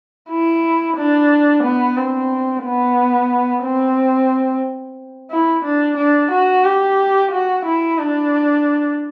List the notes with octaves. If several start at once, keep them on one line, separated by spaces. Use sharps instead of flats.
E4
D4
B3
C4
B3
C4
E4
D4
D4
F#4
G4
F#4
E4
D4